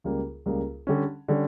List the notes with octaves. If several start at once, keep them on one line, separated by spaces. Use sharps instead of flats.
C#2 C#3 G3 A#3
C#2 C#3 G3 A#3
D3 G3 C#4
D3 G3 C#4